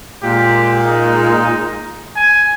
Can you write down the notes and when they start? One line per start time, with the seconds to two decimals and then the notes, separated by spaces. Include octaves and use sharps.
0.22 A#2 G#3 G4
0.86 D#4
2.16 G#5